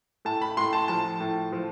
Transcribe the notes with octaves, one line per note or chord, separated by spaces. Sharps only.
A2 A5
B5
A2 C6
A5
F3 A5
A2
F3